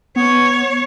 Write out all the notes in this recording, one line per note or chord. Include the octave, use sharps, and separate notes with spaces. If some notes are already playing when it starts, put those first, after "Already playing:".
B3 C#5